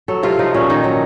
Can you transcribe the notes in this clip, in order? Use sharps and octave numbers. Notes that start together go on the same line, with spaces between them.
F#3 A4
C3 F4
F3 D#4
A#2 C#4
D#3 D#4
F#3